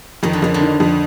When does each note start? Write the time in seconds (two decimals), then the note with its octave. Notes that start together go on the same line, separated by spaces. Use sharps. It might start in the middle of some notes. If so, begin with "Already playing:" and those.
0.23 F2 D#3
0.33 D3
0.42 F2 C#3
0.54 D3
0.61 D#3
0.80 F2